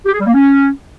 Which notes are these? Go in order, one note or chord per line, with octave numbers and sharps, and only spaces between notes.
G4
G#4
G3
A#3
C#4